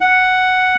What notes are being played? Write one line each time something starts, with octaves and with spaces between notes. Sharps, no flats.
F#5